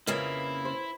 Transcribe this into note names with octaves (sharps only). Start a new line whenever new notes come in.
F2 C#3 A#3 E4 F4 B4 D#5 E5
C5